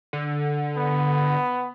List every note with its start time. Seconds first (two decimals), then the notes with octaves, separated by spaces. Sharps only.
0.13 D3
0.77 B3